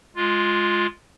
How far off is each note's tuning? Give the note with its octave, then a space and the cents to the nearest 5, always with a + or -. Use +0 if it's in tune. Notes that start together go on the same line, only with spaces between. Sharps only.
G#3 +0 F4 +5